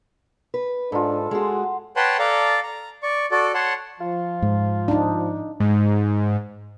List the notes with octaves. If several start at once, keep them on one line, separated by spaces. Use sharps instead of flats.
B4
G#2 D4 F4 A4 B5
G#3 F#4 G#4 F#5 A5 C6
B4 C#5 F#5 G5 A5 C6
A4 D5 F5 A#5
A#5
D5 C#6
F#4 A4 D5
C#5 F#5 A5 C6
F3 F4
G#2
D4 D#4
G#2